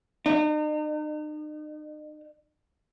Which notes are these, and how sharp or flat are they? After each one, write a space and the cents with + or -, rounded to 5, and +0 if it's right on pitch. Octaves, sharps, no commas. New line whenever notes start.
D#4 -40